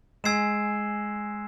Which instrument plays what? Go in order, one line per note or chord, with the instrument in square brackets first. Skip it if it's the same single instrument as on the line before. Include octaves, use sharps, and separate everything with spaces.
[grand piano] G#3 [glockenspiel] G#5 E6 G#6 C7 E7